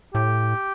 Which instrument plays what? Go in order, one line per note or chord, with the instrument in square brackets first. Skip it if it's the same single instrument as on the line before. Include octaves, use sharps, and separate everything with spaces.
[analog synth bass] A2 [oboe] G4